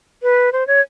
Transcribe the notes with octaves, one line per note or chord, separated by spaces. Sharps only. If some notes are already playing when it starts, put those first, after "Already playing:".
B4
C5
C#5